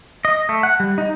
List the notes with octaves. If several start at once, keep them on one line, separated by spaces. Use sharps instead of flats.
D#5
A3
F#5
G3
D#4